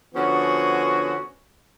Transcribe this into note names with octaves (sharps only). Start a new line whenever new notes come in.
D3 F3 B3 C#4 F#4 G#4